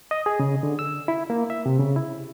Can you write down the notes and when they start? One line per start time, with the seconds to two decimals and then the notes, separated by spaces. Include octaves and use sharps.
0.11 D#5
0.26 G#4
0.40 C#3
0.63 D3
0.79 E6
1.08 E4
1.30 A#3
1.50 E5
1.66 C3
1.80 C#3
1.96 E4